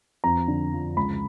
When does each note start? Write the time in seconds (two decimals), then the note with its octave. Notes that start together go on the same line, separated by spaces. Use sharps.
0.24 F2 A#5
0.48 D3
0.73 F3
0.97 C#2 B5